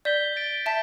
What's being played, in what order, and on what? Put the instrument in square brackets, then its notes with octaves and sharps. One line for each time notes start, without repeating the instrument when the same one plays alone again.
[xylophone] D5 [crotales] G6 B6 G7
[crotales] A6 D7 G7
[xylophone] E5 A5 [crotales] B6 E7